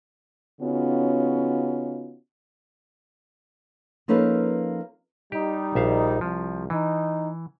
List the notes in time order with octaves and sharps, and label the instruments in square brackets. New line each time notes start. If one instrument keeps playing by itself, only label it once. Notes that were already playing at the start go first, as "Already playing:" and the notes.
[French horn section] C#3 B3 C#4 D#4 F4 F#4
[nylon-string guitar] F3 A#3 C#4 D#4 A4 B4
[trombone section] G3 D#4 [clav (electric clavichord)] G4
[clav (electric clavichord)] A#1 E5 F5
[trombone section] C2 [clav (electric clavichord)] F3
[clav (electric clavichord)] E3 [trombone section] D#4